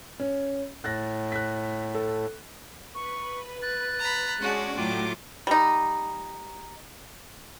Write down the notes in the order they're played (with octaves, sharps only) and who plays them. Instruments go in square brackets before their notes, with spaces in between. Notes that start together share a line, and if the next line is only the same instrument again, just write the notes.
[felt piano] C#4
[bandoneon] A2 [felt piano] F#6 A6 A#6
[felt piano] F#6 B6
A4
[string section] B4 [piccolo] C#6
[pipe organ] F#6 [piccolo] A6
[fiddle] A#5 B5
[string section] G#3 C#4 D4 [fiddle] F#4 D5
[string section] A2 F#3 D6 [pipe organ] F4 [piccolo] G5
[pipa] G3 D#4